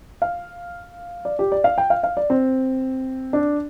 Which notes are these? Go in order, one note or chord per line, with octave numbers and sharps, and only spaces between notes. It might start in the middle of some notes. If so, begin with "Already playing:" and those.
F5
D5
G4
D5
F5
G5
F5
F5
D5
C4
D4